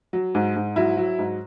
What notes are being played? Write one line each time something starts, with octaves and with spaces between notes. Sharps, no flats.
F#3
G#2
G#2
F#3 E4
F#3
G#2